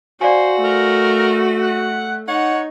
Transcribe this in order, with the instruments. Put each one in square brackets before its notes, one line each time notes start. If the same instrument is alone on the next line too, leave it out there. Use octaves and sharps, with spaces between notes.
[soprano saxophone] F#4 [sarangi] C5 [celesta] D5 F5 G#5
[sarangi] A3 [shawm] A#4
[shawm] F#5
[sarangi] D#4 [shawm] C#5 [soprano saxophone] F#5